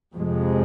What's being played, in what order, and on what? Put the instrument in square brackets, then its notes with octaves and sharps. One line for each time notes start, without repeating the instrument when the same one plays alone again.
[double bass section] F2 C3 G#3